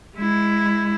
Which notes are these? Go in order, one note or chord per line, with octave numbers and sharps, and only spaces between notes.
G#3 E4